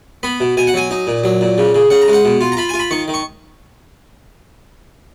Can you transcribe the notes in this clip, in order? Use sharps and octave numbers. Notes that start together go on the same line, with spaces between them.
B3 B5
B2
B2 G#5
F#5
F#3 G#5
D#4
A#2
F#3
A#2
C#3
C#3
C#3 F#5
A#5
G#3 F#5
B2
F4
A#5
F4 B5
F4 G#5
B5
D#3 C#6
D#3
C#6